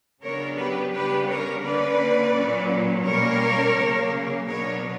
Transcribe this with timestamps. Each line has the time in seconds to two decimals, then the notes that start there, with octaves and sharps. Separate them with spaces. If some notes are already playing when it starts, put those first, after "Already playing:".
0.22 C#3 F#3 B3 D4 A#4 C#5
0.57 G4 B4
0.92 C#3 G3 B3 D4 G4 B4
1.28 A#4 C#5
1.64 D3 A#3 C#4 B4 D5
2.34 A#2 F#3 C#4
3.05 B2 G3 A#3 C#4 A#4 C#5
3.76 C#3 F#3 A#3
4.47 B2 F#3 B3 D4 A#4 C#5